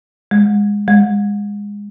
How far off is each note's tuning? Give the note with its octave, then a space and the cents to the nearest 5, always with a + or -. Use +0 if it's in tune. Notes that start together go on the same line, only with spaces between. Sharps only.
G#3 -15
G#3 -20